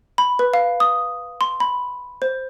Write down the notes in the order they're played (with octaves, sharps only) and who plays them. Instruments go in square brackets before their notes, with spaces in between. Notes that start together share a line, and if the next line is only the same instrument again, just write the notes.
[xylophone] B5
B4
F5
D#6
C6
B5
C5